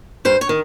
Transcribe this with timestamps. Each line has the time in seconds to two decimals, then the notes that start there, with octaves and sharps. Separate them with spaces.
0.25 G2 C5
0.41 C#5
0.49 D#3